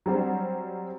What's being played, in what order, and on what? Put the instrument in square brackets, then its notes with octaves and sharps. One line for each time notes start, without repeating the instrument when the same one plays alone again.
[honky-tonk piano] F#3 G3 C4